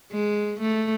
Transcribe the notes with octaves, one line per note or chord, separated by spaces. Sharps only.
G#3
A3